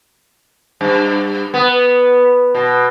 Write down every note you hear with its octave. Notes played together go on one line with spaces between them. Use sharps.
G2
B3
B2